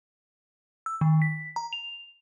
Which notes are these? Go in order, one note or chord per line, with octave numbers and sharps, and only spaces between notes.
E6
D#3
B6
A#5
F7